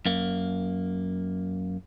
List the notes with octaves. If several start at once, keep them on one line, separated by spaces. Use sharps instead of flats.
F#2 A#3